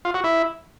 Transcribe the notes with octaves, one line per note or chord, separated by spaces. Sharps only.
F4
F#4
E4